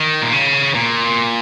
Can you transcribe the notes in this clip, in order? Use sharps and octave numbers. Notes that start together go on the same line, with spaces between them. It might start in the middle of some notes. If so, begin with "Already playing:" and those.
Already playing: D#3
A#2
C#3
A#2